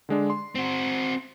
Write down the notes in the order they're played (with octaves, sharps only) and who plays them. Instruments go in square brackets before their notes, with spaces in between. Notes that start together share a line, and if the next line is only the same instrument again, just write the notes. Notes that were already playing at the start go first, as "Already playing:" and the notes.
[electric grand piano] D3 G#3 D4
C6
[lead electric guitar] C4 F#4